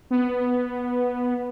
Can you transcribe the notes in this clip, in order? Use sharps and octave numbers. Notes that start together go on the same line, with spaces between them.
B3